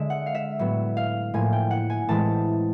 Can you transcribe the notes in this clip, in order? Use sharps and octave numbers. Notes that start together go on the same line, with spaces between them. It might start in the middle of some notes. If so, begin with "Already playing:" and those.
Already playing: D3 G#3 E5
F#5
F5
E5
A2 F#3 B3
F5
A2 F3 A#3 G#5
G5
F#5
G#5
A2 E3 G#3 C4 A5